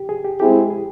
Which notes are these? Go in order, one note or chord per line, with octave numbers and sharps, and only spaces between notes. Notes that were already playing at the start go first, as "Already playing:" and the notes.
Already playing: G4
G#4
G4
G#3 C4 E4 G4 G#4
G#4